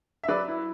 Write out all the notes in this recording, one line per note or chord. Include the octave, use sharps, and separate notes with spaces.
E5
F#3 B4 D5
E4